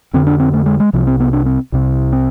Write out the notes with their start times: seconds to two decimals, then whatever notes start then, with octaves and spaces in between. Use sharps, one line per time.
0.14 F2 D3 C4
0.27 D4
0.40 C4
0.53 A3
0.66 G#3
0.80 G#3
0.93 C2 C3 F3
1.07 C4
1.20 B3
1.33 D4
1.46 C4
1.72 C2 C3
2.13 C4